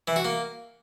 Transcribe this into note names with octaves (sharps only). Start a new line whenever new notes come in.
E3
F#4
A#3